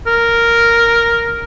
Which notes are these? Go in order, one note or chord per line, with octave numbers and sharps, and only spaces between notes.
A#4